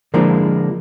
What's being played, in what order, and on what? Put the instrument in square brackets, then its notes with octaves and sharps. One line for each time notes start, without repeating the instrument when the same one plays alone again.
[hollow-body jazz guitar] D3 F3 G#3 A#3 E4